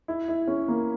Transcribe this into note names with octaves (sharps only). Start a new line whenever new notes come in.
E4
E4
C#4
A#3